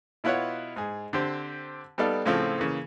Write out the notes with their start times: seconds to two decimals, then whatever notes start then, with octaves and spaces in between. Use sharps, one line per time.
0.24 B2 E4 F4 B4 C#5 F#5
0.76 G#2 G#4
1.13 D3 C4 G4 C5
1.98 G3 B3 D#4 A4 D5 F5
2.25 A2 C#3 F3 C4 F4 A4
2.59 C#3 E3 A#3